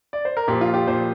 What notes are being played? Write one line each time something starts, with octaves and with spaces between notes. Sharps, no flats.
D5
C5
A#4
A#2 F3 G4
F4
G4
A#2 F3 C5